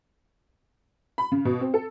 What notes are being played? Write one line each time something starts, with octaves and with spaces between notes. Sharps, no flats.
B5
C#3
B2
C4
A4